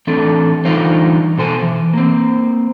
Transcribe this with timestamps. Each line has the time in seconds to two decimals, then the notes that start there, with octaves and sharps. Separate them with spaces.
0.07 E3 A3 C4 D4 A4
0.65 D3 E3 G3 D#4 F4 C5
1.38 B2 A4 C5 G#5
1.62 E3
1.93 A#3 C4